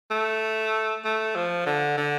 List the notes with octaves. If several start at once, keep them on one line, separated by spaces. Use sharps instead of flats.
A3
A3
F3
D3
D3